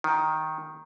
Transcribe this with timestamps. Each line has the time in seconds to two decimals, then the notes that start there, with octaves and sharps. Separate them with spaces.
0.04 D#3